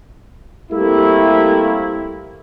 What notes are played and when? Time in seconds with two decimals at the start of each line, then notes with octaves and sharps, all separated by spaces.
0.71 G3 A3 A#3 C4 E4